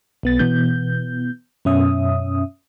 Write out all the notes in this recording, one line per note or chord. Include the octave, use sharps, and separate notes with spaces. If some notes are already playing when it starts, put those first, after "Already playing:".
B1 B3 A6
B2 E3 B3 G6
F#2 B2 C#4 E5 D#6